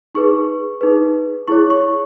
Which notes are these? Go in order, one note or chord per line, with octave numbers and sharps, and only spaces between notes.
D#4 G#4 B4 C#6
D#4 G#4 B4
E4 G#4 C#5 C#6
C#6